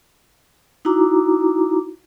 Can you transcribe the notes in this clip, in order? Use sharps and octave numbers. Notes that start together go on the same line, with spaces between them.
D#4 E4 F#4 A#5 D6